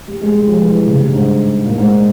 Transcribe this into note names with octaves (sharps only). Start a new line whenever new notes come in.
G3
G#3
G3
F3
E3
E3
C#3
G2
G#2
A#2
G#2